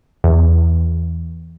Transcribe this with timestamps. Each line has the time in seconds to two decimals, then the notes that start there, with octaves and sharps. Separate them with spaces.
0.24 E2